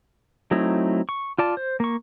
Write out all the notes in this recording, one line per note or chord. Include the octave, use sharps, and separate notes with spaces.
F#3 A3 C4 D#4 E4
C#6
F4 D5 A5
C5
A#3 C#6